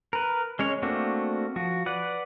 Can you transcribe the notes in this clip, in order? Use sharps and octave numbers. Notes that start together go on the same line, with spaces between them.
A#4 B4
G#3 C#4 C#5
A3 A#3 C4 D4 F#4
F3 F#4
B4 D5 F#5